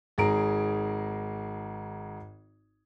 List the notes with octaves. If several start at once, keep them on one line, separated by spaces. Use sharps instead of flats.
G#1 G#4 A#5 D7